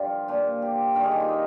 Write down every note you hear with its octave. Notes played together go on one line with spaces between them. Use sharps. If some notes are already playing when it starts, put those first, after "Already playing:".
Already playing: G2 D3 F3 F4 G4
A#2 F3
G4
G2 D#3 A#4
G#4
G4
F4
D#4